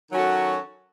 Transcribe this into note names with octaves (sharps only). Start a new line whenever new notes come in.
D#3 F#3 C#4 F#4 A4